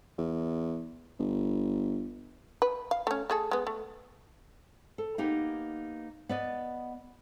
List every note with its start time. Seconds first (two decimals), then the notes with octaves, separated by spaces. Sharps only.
0.18 E2
1.19 G1
2.62 B4
2.91 F5
3.07 A3 C#4
3.30 A3 G#4 A4
3.51 G#3 B3
3.67 A3
4.98 A4
5.18 A#3 B3 D#4 G4
6.29 B3 D5 D#5